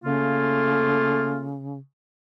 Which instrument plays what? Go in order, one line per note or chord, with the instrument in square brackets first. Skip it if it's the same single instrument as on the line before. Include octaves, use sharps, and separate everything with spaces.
[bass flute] C#3 [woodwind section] A3 A#3 F4